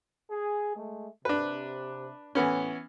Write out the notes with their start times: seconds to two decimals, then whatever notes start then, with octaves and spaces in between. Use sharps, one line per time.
0.31 G#4
0.76 G#3 A3
1.25 C3 D4 B4
2.35 A2 E3 B3 C#4